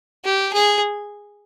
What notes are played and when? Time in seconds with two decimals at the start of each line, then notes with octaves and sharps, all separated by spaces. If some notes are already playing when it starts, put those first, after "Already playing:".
0.24 G4
0.53 G#4